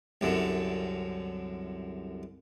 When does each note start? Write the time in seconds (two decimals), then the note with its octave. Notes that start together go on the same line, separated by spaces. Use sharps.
0.21 C2 F#2 D3